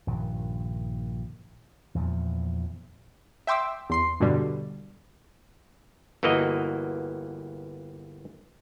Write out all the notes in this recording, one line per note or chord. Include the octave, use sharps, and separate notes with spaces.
A#1 G2 D#3
E2 A#2 F3
E5 G5 C6 D6 E6
E2 C6 C7
G2 B2 D3 G3
G1 E3 A#3 F#4 D#5